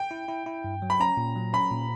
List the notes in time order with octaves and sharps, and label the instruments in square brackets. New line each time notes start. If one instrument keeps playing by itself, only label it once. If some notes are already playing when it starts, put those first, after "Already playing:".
Already playing: [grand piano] G5
[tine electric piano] E4
E4
E4
G2
F#3
[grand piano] B5
[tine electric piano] C#4 [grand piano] A#5
[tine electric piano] A#2
F#3
[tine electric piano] C#4 [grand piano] B5
[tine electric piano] A#2